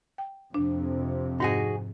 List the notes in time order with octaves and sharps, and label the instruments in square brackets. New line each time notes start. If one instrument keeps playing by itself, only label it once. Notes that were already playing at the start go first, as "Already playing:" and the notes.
[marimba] G5
[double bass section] F2 C3 [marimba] D4
[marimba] G#2 [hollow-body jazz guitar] D#4 F#4 G#4